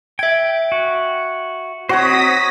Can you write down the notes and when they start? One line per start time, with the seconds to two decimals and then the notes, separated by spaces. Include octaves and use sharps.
0.19 E5 G5 G#6
0.72 F#4
1.89 C4 D#4 F#4 C5 C#5 D#6 A#6 B6